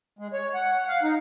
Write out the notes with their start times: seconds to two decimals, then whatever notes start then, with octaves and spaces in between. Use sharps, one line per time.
0.19 G#3
0.33 C#5
0.54 F#5
0.88 F5
1.03 D#4